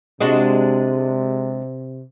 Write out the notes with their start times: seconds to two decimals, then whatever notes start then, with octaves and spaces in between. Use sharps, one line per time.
0.21 C3 G#3 D4 F#4